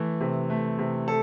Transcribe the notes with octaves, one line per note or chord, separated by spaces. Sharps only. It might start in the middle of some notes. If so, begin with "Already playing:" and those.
Already playing: E3 A3
C3
A3
C3
A4